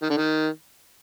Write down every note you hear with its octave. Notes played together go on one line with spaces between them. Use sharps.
D#3
D3
D#3